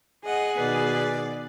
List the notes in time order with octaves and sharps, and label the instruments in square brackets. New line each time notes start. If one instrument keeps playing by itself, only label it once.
[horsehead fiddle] G#4 [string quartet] D#5 F#5
[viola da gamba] B2 D#3 [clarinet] B4 [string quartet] D5